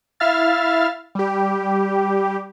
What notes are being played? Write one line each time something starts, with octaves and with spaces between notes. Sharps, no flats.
E4 E5 F5 F6 A6
G3 G4